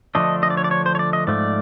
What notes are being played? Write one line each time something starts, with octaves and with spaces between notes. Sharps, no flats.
D3 F3 A3 D4 D#5
D#5
D5
C#5
D5
C#5
C5
C#5
D5
D#5
G#2 F3 A3 D5